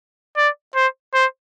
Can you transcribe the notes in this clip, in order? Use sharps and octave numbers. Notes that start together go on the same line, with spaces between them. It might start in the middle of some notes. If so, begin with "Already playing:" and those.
D5
C5
C5